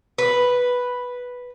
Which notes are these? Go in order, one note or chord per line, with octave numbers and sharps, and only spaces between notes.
B4